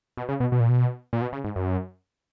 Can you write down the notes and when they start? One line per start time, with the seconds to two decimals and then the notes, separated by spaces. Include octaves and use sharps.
0.17 B2
0.29 C#3
0.40 B2
0.52 B2
0.60 A#2
0.69 B2
1.13 A#2
1.22 B2
1.33 C#3
1.44 G#2
1.56 F#2